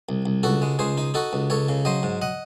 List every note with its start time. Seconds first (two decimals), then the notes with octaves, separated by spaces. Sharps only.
0.09 C2
0.26 C2
0.43 C#2 F#4 A4
0.62 G#3
0.79 C#2 G#4 C5
0.97 D#4
1.14 D#4 F#4 A4
1.33 C#2
1.50 C#2 A4 C#5
1.68 C#3
1.85 F#3 C5 D#5
2.03 G#2
2.22 D#5 F#5